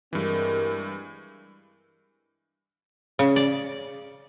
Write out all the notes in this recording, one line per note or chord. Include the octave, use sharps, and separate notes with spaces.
G2 E3 G#3 C4 A#4
C#3
D5